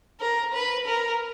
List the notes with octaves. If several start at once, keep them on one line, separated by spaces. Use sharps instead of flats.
A#4
B4
A#4